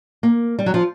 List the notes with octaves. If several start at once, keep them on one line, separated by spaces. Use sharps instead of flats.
A#3
G3
F#3
F3